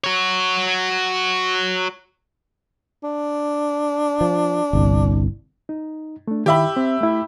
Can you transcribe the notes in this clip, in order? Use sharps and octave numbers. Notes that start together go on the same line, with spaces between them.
F#4 C#5
D4
F3
G1 C2
D#4
A3 D4
D#3 E4 G4 E5 B5
C4
A3 E4